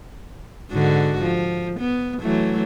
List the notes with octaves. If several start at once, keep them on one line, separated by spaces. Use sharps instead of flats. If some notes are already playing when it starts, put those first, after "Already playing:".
G#2 D3 F#4
F3
B3
E3 F#3 A3